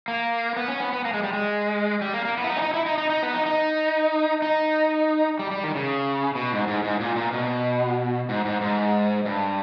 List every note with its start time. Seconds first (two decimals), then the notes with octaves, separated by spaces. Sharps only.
0.08 A#3
0.56 B3
0.68 C#4
0.80 B3
0.93 B3
1.05 A#3
1.14 G#3
1.24 G3
1.33 G#3
2.02 G3
2.14 A#3
2.25 A#3
2.38 B3
2.44 E4
2.50 D#4
2.57 C#4
2.62 D#4
2.74 E4
2.86 D#4
2.98 D#4
3.10 D#4
3.23 B3
3.34 D#4
3.46 D#4
4.42 D#4
5.39 G3
5.51 G3
5.64 D#3
5.75 C#3
6.35 B2
6.52 G#2
6.67 G#2
6.84 G#2
7.00 A#2
7.16 A#2
7.33 B2
8.29 G#2
8.45 G#2
8.61 G#2
9.25 G2